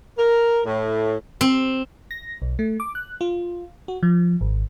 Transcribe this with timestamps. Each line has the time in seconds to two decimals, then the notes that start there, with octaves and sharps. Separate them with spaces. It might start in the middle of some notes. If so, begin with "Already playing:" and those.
0.18 A#4
0.65 A2
1.41 C4
2.11 A#6
2.42 B1
2.59 A3
2.80 D6
2.95 F#6
3.21 F4
3.88 F#4
4.03 F3
4.41 G#1